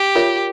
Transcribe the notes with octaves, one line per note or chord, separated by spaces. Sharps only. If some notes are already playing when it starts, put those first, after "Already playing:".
Already playing: G4
F4 A#4 C#5 E5